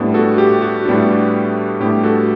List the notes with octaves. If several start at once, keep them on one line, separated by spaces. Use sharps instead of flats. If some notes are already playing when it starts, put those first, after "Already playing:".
Already playing: A2 G3 B3 D4
F#4 A4
G4
F#4
A2 G3 B3 D4
A2 G3 B3 D4 G4
F#4 A4